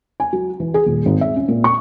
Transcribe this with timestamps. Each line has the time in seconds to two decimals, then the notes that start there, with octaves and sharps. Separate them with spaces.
0.20 G#5
0.33 F#3
0.60 E3
0.74 G#4
0.86 D#1
1.06 G#1
1.21 E5
1.36 C#4
1.48 A#2
1.64 C#6